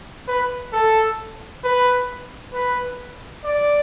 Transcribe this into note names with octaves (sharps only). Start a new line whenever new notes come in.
B4
A4
B4
B4
D5